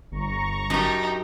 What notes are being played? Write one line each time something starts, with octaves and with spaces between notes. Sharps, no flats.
G1 A#5 C#6
F#2 D#4 G4 A5